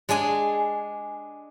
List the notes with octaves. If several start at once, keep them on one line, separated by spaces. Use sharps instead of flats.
G#3 D4 G#4 G#5